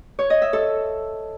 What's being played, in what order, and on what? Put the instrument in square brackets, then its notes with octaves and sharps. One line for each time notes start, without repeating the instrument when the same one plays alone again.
[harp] C#5
D#5
E5
A4